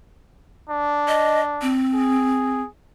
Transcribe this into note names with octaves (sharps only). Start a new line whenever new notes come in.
D4
D#5
C4
G#4